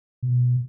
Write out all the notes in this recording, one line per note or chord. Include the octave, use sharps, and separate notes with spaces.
B2